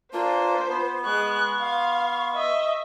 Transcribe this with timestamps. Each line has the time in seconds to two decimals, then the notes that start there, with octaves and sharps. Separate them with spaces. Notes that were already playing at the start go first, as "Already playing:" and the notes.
0.13 A#3 D4 F4 B4 C5
0.69 B3
1.04 G#3 C#6 F#6
1.59 F5 C6
2.35 D#5 E5